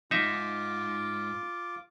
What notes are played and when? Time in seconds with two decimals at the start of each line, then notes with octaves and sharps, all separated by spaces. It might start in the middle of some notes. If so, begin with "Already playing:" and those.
0.11 F2 G#2 D#4 F4 E5 D6